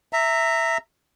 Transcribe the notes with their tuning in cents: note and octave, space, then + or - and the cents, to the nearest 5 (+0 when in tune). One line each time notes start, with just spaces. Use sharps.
E5 +0 A#5 -20